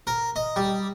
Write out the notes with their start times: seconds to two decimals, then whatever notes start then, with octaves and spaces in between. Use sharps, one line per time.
0.07 A#4
0.36 D#5
0.56 G3